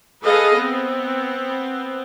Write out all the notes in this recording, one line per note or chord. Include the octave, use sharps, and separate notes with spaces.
G#4 A4 B4 D#5 F5
B3 C4